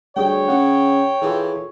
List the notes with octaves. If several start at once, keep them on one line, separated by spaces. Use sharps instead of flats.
D2 G3 G#4 C#5 G5
C#3 F#5
E3 F4 G#4 A4